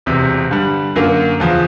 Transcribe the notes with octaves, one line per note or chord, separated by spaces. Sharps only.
E1 E2 C3
G2 D3 G3
F#2 D3 F#3 A#3
E2 C#3 F3